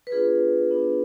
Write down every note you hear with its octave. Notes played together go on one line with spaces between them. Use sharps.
B4
B3 D4 F4 G#4
B3 D4 F4